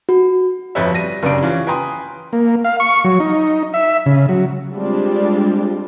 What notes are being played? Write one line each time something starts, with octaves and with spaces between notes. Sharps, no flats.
F#4
G1 F2 F3 B4 C#5 E5
G3 A#6 D#7
F#1 C#3 D4 G4 D7
E3 C#4 F4
B4 G5 G#5 A#5 C6 D#6
A#3
F5
C#6
F#3
D#4
E5
C#3
F#3
G3 G#3 C4 D4 F4